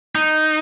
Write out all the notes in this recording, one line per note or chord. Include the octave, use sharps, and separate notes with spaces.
D#4